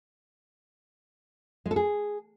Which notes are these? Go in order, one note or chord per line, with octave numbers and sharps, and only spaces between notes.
G#3
A4
G#4